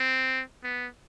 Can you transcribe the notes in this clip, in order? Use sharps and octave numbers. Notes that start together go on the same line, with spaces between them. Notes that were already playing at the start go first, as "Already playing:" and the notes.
Already playing: C4
B3